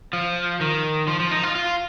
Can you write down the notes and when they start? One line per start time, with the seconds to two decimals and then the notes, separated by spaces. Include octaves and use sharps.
0.13 F3
0.61 D#3
1.08 F3
1.20 F3
1.31 D#4
1.43 F4
1.55 F4